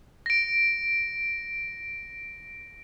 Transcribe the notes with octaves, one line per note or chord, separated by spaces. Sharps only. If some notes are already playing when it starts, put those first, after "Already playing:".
A#6 D7